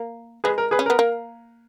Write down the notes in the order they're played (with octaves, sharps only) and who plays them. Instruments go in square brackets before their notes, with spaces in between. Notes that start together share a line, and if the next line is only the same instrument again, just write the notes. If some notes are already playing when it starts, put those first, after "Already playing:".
Already playing: [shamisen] A#3
[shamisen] G#3 [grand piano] G#4 B4
[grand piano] A#4
G#4 B4
[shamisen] C#4
[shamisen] B3 [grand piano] A#4
[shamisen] A#3